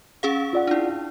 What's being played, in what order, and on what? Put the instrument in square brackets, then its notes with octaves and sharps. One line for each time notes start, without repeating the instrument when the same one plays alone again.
[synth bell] C#4 G#4 F5
[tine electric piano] F4 D5 F#5
[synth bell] D4 E4